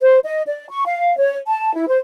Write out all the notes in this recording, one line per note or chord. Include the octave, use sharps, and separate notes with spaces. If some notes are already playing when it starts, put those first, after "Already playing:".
C5
D#5
D5
C#6
F5
C#5
A5
E4
C5